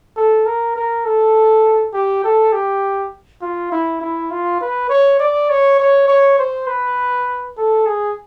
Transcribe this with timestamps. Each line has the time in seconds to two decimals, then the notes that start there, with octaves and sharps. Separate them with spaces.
0.16 A4
0.46 A#4
0.75 A#4
1.05 A4
1.93 G4
2.24 A4
2.52 G4
3.41 F4
3.72 E4
4.01 E4
4.30 F4
4.61 B4
4.89 C#5
5.19 D5
5.50 C#5
5.79 C#5
6.08 C#5
6.38 C5
6.67 B4
7.57 A4
7.86 G#4